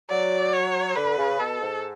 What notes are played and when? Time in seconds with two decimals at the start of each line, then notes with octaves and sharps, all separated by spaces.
0.10 F#3 D5
0.53 C#5
0.96 D3 B4
1.17 C#3
1.39 B2 A4
1.61 G#2